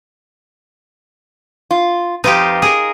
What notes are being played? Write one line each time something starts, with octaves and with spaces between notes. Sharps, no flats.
F4
F2 D#4 F4 G4 B4
G#4 A#4